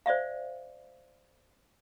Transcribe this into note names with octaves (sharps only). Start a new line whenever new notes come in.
C5 D5 E5 F5